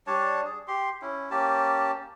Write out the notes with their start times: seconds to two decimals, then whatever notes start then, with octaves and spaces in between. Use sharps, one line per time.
0.07 G3 D4 C#5 A5
0.45 G#4
0.68 G4 C6
1.02 C#4 E4
1.31 A#3 C#4 G4 A5